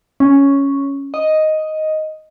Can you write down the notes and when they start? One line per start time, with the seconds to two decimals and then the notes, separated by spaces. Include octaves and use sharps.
0.20 C#4
1.14 D#5